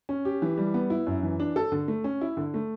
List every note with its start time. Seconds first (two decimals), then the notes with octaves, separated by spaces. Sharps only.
0.09 C#4
0.25 G4
0.42 E3
0.58 G3
0.74 B3
0.90 E4
1.07 F#2
1.23 E3
1.40 D4
1.56 A4
1.72 D3
1.88 A3
2.04 C#4
2.21 E4
2.37 D3
2.54 A3